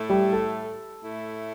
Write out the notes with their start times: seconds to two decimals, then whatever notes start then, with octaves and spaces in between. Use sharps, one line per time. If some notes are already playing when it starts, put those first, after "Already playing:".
Already playing: A2 A3 E4
0.09 G3
0.33 A4
1.03 A2 A3 E4